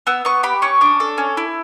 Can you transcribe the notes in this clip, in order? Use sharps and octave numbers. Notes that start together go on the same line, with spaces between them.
B3 E6
B3 C#6
G4 B5
C#4 C#6
D4 D6
A4
C#4
E4